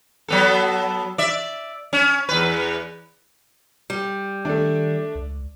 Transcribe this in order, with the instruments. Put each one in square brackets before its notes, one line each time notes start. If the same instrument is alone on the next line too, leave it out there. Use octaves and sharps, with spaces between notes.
[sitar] F#3 B3 A4
D5 E5
C#4
E2 B4
[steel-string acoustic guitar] G3
[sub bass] D#3 [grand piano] A3 D4
[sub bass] C#2